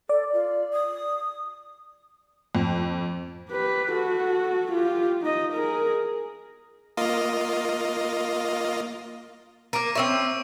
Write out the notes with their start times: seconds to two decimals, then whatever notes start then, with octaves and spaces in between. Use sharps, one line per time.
0.09 A4 D5
0.33 F4
0.73 D#6
2.55 F2
3.50 G4 B4
3.92 F#4 A4
4.72 F4 G4
5.21 D#4 D#5
5.54 G#4 A#4
6.97 A#3 F4 D#5
9.73 A#3 A#4 D6 D7 D#7
9.95 C4 C#4 E5 C#6 E6